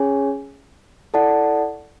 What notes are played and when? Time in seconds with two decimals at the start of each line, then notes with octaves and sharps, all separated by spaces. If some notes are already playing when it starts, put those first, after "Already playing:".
Already playing: C#4 G#4 C#5 G#5
1.14 E4 A4 D5 F#5 A5